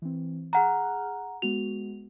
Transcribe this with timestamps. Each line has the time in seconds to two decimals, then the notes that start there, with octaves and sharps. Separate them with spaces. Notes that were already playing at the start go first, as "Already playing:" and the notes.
0.02 E3 C4
0.53 G#4 F#5 A#5 F6 F#6
1.42 G#3 B3 F#4 F7